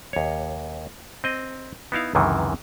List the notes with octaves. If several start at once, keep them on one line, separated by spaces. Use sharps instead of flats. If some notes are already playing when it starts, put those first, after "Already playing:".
D#2 C#5
C4 D#5
B3 D#4 E4 F5
C#2 F#2 C3 D#3 E3